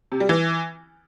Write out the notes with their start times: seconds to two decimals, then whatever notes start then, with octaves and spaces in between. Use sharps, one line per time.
0.12 C3
0.20 G3
0.29 E3